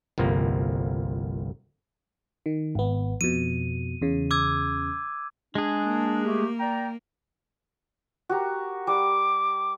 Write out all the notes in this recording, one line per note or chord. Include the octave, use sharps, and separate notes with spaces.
G1 C2 F3 A#3
D#3
G#1 B3
F2 B2 D#7
E2 C#3
D6 E6 G#6
G#3 D4 G#4
A#3
A3 G4
D5 G5 A#5
F#4 G4 A#4
G3 D6